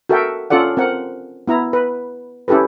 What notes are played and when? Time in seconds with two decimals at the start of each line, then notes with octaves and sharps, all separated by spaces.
0.09 F#4 A4 A#4 E5 G5
0.50 C#4 F4 A4 D5 F#5
0.77 C4 A#4 F#5
1.48 B3 E4 A#5
1.73 B4
2.48 C#4 E4 G4 A4 B4